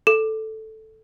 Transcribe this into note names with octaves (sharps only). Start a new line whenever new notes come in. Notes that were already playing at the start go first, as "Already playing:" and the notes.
A4